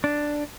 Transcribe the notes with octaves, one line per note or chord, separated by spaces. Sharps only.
D4